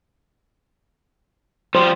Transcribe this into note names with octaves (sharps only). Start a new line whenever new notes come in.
F3 G3 C5